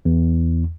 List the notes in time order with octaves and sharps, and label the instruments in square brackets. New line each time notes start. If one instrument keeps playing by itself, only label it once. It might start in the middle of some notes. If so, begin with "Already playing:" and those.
[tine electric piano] E2